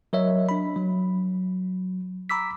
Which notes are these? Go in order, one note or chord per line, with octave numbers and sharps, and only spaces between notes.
F#3 A#4 C#5 D#5 E5
D4 B5
F#3
A#5 B5 D6 E6 B6